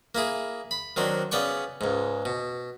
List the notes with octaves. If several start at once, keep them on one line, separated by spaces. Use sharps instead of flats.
A#3 E4 G#4
B5
D#3 F#3 C4 D4
C#3 B3 D5 G5 C#6
C#2 G#2
B2